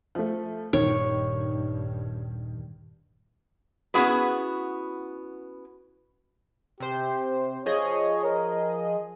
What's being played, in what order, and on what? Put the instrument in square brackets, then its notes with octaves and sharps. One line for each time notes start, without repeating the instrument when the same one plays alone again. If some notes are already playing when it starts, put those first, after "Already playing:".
[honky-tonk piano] F3 A3
[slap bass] D#1 [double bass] G2 [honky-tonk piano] D#3 [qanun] C#5
[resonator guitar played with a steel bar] B3 C#4 E4 F#4 G#4 B4
[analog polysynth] C3 C5 [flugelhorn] G4
[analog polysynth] F3 G#4 D#5 [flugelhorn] C#5
[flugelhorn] A#4